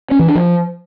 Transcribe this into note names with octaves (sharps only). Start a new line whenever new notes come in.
C#4
E3
D4
F3